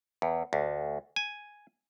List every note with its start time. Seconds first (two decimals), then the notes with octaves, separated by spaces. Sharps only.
0.22 E2
0.53 D2
1.16 G#5